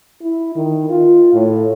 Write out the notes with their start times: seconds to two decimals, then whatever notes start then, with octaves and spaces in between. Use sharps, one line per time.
0.22 E4
0.56 D#3
0.89 F4
1.34 A2